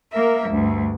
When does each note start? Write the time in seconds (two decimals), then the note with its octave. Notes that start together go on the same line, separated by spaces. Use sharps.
0.11 A#3 A#4 E5
0.49 D2 G2